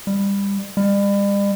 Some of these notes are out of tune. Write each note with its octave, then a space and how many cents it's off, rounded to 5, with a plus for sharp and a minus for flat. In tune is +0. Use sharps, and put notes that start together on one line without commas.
G3 +25
G3 +40